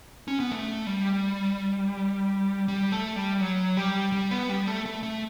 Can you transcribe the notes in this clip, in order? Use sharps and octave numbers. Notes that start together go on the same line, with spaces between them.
C#4
B3
A3
G3
G3
A3
G3
F#3
G3
G3
B3
G3
A3
A3
A3